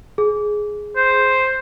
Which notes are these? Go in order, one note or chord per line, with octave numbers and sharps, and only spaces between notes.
G#4
C5